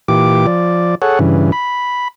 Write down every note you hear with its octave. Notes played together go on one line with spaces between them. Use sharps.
A#2 E3 G4 D6
F3 D5
G#4 A4 C#5 F#5
G2 C#3 E3
B5